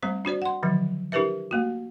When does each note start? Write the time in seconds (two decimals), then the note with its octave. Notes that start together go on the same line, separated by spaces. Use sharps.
0.03 G3 A3 C4 C5
0.25 D4 F#4 C5 D5
0.42 F#5 C6
0.63 D3 D#3 F3 F#3
1.12 D4 E4 G4 A#4 B4 E5
1.51 A3 A#3 F#4